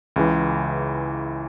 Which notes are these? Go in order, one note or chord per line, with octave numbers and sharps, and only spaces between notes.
C#2 C#3 E3